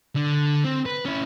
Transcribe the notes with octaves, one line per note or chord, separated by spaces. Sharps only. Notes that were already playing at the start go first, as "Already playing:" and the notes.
D3
C4
B4
C#4 E4